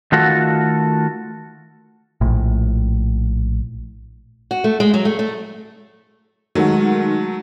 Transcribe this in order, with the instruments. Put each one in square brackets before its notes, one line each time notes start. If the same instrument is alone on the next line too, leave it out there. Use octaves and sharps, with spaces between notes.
[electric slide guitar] D#3 A3 F4 F#4 A4
[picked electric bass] A#1 A2
[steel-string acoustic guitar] F#4
A3
G#3
F#3
A3
A3
[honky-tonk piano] D#3 G#3 F#5 [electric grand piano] F#3 A3